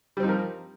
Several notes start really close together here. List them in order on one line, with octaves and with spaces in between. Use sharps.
G3 C4 D#4 F3 A#4